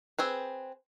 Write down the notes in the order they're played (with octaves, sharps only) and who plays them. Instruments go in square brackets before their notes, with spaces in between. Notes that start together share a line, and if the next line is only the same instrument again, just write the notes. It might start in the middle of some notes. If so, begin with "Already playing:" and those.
[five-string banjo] C4 G#4 B4